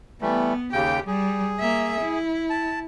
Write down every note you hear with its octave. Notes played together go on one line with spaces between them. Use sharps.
E3 G3 A3 B3
D#2 C#3 G4 G5
G3 G#4
A#3 E5
E4
A5